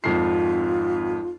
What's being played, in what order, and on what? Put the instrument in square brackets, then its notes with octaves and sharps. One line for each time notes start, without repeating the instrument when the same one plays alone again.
[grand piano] G#1 F2 C7 [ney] F4